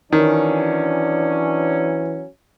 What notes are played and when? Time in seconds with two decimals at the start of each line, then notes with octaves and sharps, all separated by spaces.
0.12 D#3 E3 F#3 C#4 D4